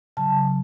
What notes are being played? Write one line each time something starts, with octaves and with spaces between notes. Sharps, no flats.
C#3 F#3 A5